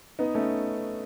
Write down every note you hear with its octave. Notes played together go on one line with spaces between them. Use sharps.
B3 D#4
A3 C#4